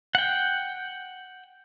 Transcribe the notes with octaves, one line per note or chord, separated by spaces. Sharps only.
F#5 G5